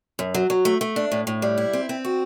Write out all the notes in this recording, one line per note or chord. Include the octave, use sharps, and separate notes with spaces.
F#2
F#3
F#3
A3
A3
D4
A2
A2
G3
E4
C4
C4
F#4